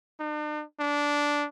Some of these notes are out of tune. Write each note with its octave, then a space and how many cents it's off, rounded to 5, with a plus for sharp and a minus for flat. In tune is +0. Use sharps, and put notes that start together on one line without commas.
D4 +45
D4 -10